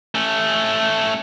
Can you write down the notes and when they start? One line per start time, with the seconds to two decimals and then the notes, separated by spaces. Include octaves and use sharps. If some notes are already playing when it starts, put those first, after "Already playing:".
0.15 A3 C#4